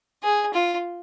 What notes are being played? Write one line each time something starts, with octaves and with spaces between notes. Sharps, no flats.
G#4
F4